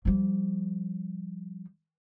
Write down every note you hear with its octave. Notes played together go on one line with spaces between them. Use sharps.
F3 G3